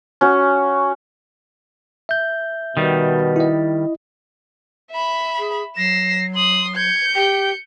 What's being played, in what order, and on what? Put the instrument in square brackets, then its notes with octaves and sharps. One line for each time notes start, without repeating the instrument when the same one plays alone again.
[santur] C#4 F#4
[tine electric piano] E5 G6
[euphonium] B2 [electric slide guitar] D#3 G3
[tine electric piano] E4 D#5
[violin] E5 B5
[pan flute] G#4
[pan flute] F#3 [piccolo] A#6 [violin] C7 E7
[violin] C6 D#6 [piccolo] F#7
[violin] G6 C#7 [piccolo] G#6
[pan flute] G4 [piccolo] G5